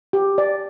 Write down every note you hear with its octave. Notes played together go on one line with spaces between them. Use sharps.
G4
D5